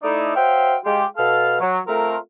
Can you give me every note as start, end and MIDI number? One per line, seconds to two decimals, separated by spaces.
0.03 0.32 57
0.03 0.32 63
0.03 0.32 64
0.03 0.32 74
0.35 0.75 66
0.35 0.75 72
0.35 0.75 73
0.35 0.75 76
0.35 0.75 77
0.35 0.75 79
0.85 1.05 56
0.85 1.05 65
0.85 1.05 67
1.17 1.59 47
1.17 1.59 69
1.17 1.59 77
1.17 1.59 89
1.61 1.79 54
1.87 2.16 57
1.87 2.16 60
1.87 2.16 65
1.87 2.16 70